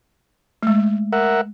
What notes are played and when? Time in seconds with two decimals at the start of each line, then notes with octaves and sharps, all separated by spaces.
0.63 G#3 A3
1.13 A#4 E5 F#5